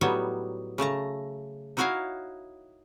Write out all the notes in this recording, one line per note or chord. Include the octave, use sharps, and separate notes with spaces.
A2 F#3 G3 B3 D#4 C#5
C#3 A3 A5 A#5
D#4 E4 F#4 A#4 C#5 F5